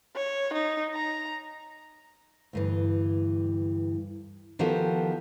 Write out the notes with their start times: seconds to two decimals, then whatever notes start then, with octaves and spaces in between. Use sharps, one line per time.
0.16 C#5
0.53 D#4
0.94 A#5
2.53 D2 G2 E3
4.59 D#3 F3 B3 F#4 G4 A4